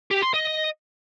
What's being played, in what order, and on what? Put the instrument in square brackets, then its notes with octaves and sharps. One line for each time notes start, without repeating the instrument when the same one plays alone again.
[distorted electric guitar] G4
C6
D#5